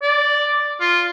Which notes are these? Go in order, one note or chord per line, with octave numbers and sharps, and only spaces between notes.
D5
F4